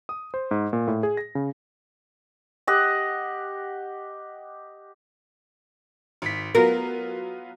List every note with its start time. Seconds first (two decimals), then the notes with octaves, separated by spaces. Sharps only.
0.09 D#6
0.34 C5
0.51 G#2
0.73 A#2
0.88 A2
1.03 G#4
1.17 A#6
1.35 C#3
2.67 G4 D#5 F#5
6.22 G#1 B6
6.55 F#3 B3 F4 A#4